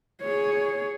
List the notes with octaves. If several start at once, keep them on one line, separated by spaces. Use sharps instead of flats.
G#4 C#5